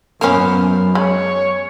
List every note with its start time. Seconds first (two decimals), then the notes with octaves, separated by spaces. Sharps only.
0.21 F#2 A#3 B3 C#4 C5 F5
0.95 G#3 C#5